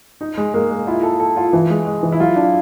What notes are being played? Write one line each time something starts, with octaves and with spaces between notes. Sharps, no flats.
D#4
G#3
G#3 A#3
G#3
E4 F4
A4
A4
F4
E3
G#3
G#3
E3
E4
F#3 F4
D4